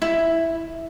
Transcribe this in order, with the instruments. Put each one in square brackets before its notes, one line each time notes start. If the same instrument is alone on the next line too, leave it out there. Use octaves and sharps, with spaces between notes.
[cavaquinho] E4